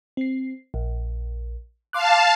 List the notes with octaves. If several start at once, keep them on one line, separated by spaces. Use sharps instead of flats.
C4 C7
A#1
F5 A5 C6 D6 F#6